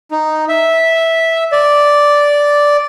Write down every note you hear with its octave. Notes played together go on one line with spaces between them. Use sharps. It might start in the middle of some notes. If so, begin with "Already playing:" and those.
D#4
E5
D5